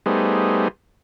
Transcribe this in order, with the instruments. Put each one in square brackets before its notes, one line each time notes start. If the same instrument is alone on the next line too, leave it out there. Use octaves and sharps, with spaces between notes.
[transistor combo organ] G3 A3 B3 D#4 G#4 C5